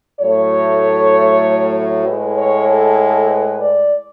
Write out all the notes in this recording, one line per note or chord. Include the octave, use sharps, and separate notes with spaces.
A2 F#3 A3 C#5
A2 G#3 B4
C#5
A4
A4
B4
D5